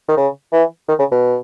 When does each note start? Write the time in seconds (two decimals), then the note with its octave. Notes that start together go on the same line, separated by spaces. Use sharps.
0.09 D#3
0.17 C#3
0.52 E3
0.88 D#3
0.99 C#3
1.11 B2